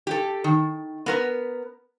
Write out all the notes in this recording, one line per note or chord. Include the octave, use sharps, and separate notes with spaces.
G4 A4
D#3
B3 A#4 B4